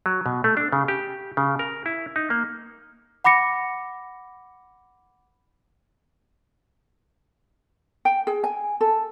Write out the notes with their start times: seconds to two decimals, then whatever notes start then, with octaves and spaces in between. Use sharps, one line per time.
0.06 F#3
0.26 B2
0.44 A3
0.57 D4
0.72 C#3
0.88 G4
1.37 C#3
1.59 A#4
1.86 E4
2.16 D#4
2.30 A#3
3.24 F#5 B5 D6 A#6 C#7
8.05 G5
8.27 G#4
8.44 G#5
8.81 A4